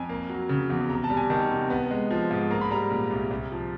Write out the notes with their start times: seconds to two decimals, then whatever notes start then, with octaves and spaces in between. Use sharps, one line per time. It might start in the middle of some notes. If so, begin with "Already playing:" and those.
Already playing: F2 G#5
0.09 A#3
0.30 F#3
0.49 C#3
0.70 E2
0.90 C3 A#5
1.04 A5
1.10 G3
1.17 G#5
1.30 D#3 A5
1.50 C3
1.70 B3
1.90 G#3
2.11 F3
2.31 G#2
2.50 A#3 A#5
2.61 B5
2.71 G3 A#5
2.91 A#2
3.11 C2
3.31 C2
3.52 F3